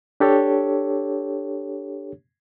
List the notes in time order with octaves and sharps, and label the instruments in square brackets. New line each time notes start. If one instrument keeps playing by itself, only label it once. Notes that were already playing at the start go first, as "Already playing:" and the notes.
[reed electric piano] D4 G4 A4 C#5